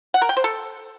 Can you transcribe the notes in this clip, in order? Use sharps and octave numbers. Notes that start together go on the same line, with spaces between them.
F#5
A#4
G5
C5
A4